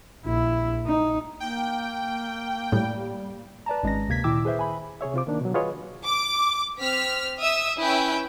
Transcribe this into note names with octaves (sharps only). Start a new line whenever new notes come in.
A#1 E4
D#4
A#3 G5
A2 G3
B4 D5 A5 A#5
G#1 G#3 C#4 A#6
D2 C3 A#3 G#6 B6
A#2 D#3 E4 G5 D6 E6
G#4 B4 C5 E5
G#5 B5
C3 G#4 C#5 E5
C3 F4 C5 D6
D#3 A#3 D4
B2 F#3
F4 F#4 G#4 B4 C#5 D#5
D6
C4 F6 B6
E5 D#6 E6
C#4 E4 B4 G5